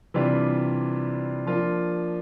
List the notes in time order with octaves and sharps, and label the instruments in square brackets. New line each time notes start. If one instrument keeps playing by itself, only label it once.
[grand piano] C3 E3 G3 D4 F4
F3 A#3 D4 F4